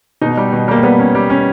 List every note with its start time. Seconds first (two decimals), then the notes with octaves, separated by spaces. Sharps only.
0.21 B2 D#4
0.37 G3
0.53 B2
0.68 G3 A#3
0.83 G3 B3
0.99 C#4
1.15 G3
1.30 C#4